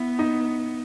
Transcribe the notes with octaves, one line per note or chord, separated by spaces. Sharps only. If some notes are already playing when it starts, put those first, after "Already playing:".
Already playing: B3 E4
D#4